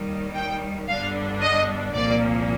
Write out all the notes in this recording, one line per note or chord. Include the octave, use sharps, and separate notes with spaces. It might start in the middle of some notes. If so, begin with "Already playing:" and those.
Already playing: D#2 D#3 G3
G5
G1 G2 D3 G3 D4 F5
D#5
C2 A#2 F3 A#3 D5